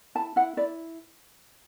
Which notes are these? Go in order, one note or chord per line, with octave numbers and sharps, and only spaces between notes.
E4 A5
E4 F#5
E4 D5